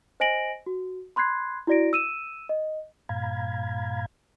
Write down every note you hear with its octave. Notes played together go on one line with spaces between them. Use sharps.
C5 D#5 G#5 A#6 D7 F#7
F#4
B5 C6 F#6 G#6 C7
E4 F#4 D5 A#6 D7
E6 D#7 E7
D#5
G2 A#2 F5 A#5 B5 G#6